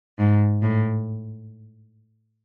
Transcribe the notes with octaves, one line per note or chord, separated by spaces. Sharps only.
G#2
A2